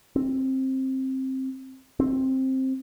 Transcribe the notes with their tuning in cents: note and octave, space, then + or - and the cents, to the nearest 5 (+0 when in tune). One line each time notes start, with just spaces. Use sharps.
C4 +15
C4 +10